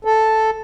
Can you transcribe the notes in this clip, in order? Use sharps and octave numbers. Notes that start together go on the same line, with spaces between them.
A4